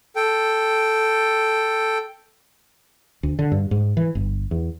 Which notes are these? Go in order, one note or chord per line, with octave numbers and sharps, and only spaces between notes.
A4 G5
D2
D3
G2
G#2
E3
G1
E2